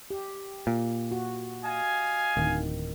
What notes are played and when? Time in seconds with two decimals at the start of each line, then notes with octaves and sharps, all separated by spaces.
0.10 G4
0.67 A#2
1.11 F#4
1.63 D#5 F5 G#5
2.37 D1 D#3